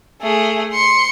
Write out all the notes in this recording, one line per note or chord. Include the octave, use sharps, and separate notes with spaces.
A3 G#4
C6 C#7